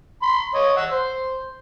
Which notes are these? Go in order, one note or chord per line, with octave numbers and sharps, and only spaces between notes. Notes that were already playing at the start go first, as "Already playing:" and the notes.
B5 C6
C#5 D#5
F#5 E6
C5